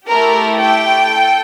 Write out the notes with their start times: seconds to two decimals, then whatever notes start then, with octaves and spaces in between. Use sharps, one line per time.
0.08 A3 E4 G4 A#4
0.60 G5
1.12 A4